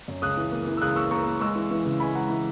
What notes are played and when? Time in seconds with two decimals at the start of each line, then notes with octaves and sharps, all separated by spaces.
0.08 F#2
0.22 C#2 D#6 F#6
0.37 E3
0.52 A#3
0.67 E3
0.77 E6
0.82 C#2 D#6 F#6
0.96 A#3 C#6 E6
1.11 A#3 A#5 C#6
1.26 A#3
1.41 G#3 C#6 E6
1.56 E3
1.71 E3
1.85 C#3
2.00 G#3 G#5 B5
2.15 G#3 F#5 A#5
2.30 E3